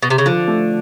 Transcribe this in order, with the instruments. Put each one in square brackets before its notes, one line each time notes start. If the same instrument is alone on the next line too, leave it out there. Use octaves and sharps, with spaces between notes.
[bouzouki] B2
C3
C#3
[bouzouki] D3 [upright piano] F3
[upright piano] A3